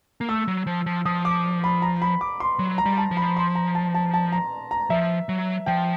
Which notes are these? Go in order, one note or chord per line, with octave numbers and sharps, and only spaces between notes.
A#3
A3 E6
F#3
F3
F3
F3 D#6
D6
B5
A#5
B5
D6
C6
F#3
A#5
G3
A5
F3
B5
C6
A#5
A5
A5
A5
A#5
A#5
F3 E5
F#3
F3 G5